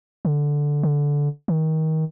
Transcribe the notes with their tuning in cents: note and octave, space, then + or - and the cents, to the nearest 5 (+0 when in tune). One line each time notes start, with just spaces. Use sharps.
D3 -5
D3 -15
D#3 +25